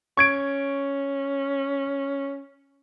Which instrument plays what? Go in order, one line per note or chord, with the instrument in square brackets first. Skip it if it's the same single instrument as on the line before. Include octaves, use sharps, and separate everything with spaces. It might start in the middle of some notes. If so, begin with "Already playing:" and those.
[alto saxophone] C#4 [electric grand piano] C#6 G#6 D7